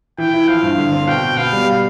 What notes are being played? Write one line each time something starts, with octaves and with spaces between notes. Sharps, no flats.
E3 G5
E4
F3 F5
G2
D3
C4
B2 G5
B2
B3 F5
G3